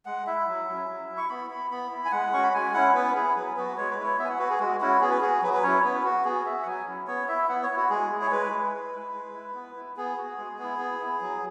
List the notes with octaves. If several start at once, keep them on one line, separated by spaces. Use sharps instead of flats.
G#3 F#5
E4 E5
F#3
C#4 E4
F#3
E4
C#6
B3 B5
E4 B5
B3 B5
E4
G#5
G#3 F#5
C#4 F#4 C#6
B5
G#3 G#5
C#4 E4 F#5
B3 B4
E4 G#4
F#3 B4
B3 F#4 B4
G#3 C#5
B4
E4 C#5
B3 E5
G#5
F#5
F#4 B4
G#4
G#3 F#4
C#4 E4 F#4
B3 G#4
B4
F#4 G#4
F#3 B4
B4
C#4 E4 C#5
B3 B4
F#4
B3 G#4
F#4 E5
F#5
F#3 G#5
C#4 E4
B3 C#5
E4 E5
B3 F#5
C#5
E4
F#4
G#3 G#4
E4
C#5
G#3 B4
E4
G#3
E4
G#3
E4
B3
E4
B3 G#4
F#4
G#3
B3 E4
B3
E4
F#3